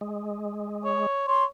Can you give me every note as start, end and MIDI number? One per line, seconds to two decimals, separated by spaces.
0.01 1.07 56
0.85 1.26 73
1.28 1.46 73
1.28 1.44 84